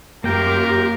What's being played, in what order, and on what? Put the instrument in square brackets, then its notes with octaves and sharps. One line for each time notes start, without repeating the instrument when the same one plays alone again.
[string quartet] F#2 [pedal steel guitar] A#3 G5 [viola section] F4 G4 [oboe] A#4